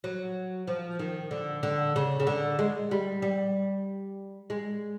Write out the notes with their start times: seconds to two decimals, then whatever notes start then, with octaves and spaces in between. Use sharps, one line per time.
0.04 F#3
0.67 F3
0.99 D#3
1.31 D3
1.63 D3
1.96 C#3
2.20 C#3
2.27 D3
2.59 G#3
2.91 G3
3.22 G3
4.50 G#3